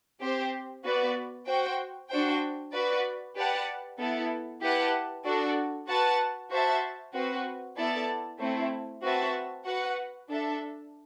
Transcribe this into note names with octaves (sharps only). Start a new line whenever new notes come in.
C4 G4 C5
B3 F#4 B4 D5
F#4 C5 G5
D4 F#4 C5 G5
F#4 B4 D5
G4 B4 D5 F#5 A5
B3 E4 A4
E4 G4 B4 F#5 A5
D4 F#4 A4 D5
F#4 B4 F#5 A5
F#4 C5 E5 A5
C4 F#4 B4
B3 E4 A4 D5 A5
A3 C4 E4
C4 F#4 B4 E5 A5
F#4 B4 F#5
D4 A4 E5